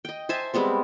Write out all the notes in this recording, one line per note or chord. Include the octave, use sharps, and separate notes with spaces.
D#5 G5
C5 E5 G#5 A5
G3 G#3 B3 C4